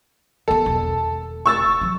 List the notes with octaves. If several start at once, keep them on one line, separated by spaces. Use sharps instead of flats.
D3 B3 A4
E1 D#2
C#6 E6 A6
E3 F#3